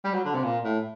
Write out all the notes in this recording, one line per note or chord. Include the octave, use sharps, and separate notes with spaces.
G3
F#3
D3
C3
A#2
A2